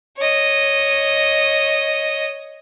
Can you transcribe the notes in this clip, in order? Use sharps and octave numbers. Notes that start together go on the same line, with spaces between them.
C#5 D#5